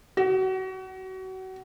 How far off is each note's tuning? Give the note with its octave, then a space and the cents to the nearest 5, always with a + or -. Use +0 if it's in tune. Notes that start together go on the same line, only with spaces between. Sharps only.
F#4 +30